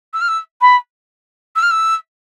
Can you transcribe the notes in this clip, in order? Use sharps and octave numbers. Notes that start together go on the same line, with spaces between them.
E6
F6
E6
B5
E6
F6
E6